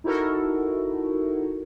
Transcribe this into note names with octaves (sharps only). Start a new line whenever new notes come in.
D#4 E4 F#4 A4 A#4